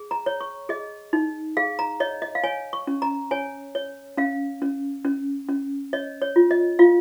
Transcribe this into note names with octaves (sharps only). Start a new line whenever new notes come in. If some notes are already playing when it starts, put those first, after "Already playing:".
Already playing: G#4
A#5
C#5
C#6
G#4 D#5
D#4
G#4 F5
A#5
C#5 D#5
D#5
F5
C#5 G#5
C#6
C#4
A#5
C#5 G#5
C#5
C#4 F5
C#4
C#4
C#4
C#5 D#5
C#5
F4
D#5
F4 F5